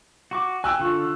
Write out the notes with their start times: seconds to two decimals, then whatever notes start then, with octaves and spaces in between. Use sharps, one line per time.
0.31 F#4 C#6 D6
0.64 G5 G#5 E6 F#6
0.80 D3 F4 C#6